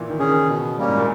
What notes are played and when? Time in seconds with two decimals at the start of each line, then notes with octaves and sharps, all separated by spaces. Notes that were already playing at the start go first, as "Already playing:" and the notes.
Already playing: A#2 E3
0.10 D#3
0.19 C#3 C#4 G#4
0.29 D#3
0.48 B2
0.78 G3 A#3 C#4
0.88 G#2
0.97 A#2